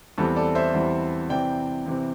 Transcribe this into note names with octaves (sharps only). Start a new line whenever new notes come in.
E2 E3 G3 C4 A4
A4 D5
C5 E5
E2 E3 G3 C4
C3 E3 C4 D5 G5
C3 E3 C4